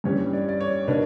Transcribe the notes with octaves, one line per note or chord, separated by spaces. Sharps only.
G2 E3 G3 C#4 C#5
D5
D5
C#5
B2 A#3 D4 B4